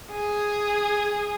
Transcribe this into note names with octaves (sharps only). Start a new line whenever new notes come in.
G#4